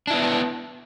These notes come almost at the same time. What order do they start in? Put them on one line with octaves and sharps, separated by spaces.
D4 E4 B3